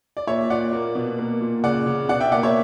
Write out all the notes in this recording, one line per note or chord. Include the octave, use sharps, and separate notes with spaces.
D5
A#2 C#5 E5
A#2 D5 F#5
A#3
B2
A#3
A#2
C#3 D5 F#5
C#3
B2 D5 F#5
E5 G5
A#3 D5 F#5
C#5 E5